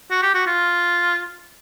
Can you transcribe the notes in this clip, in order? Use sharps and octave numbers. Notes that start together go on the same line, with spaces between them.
F#4
G4
F#4
F4